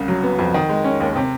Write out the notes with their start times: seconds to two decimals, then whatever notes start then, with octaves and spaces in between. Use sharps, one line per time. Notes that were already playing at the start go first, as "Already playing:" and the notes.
Already playing: C2 C#3
0.08 F#3
0.23 B3
0.39 F2
0.54 D#3
0.69 G#3
0.84 C#4
1.00 D#2
1.16 C3